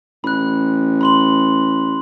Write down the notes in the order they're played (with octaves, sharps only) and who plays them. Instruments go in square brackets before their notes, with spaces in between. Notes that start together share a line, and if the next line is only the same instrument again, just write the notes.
[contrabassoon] A1 [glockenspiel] B5 F#6
[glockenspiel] B5 C6 F#7